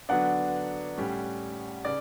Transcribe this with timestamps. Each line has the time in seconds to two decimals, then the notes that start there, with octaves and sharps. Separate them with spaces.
0.09 D3 F#3 B3 D4 F#5
0.98 A2 G3 C#4
1.85 C#3 D5